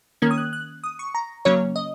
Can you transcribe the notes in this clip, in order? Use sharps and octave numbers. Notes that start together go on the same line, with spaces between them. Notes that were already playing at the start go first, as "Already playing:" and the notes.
D#3 A#3 C#4 G#6
D#6
F#6
F#6
D#6
C#6
A#5
C#3 F#3 A#3 C#4 C#5
D#5